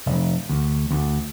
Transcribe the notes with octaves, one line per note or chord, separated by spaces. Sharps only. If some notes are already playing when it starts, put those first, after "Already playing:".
F1
D2
D2